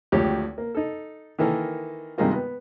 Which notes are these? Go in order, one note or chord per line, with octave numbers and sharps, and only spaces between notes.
G#1 D2 F3 G4 C#5
A#3
D#4 A4
D#3 E3 A#3 A4 A#4
G2 C3 D#3 G#3 A#3 F4
B3